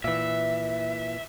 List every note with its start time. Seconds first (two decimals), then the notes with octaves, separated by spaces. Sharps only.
0.04 A#2 E3 E5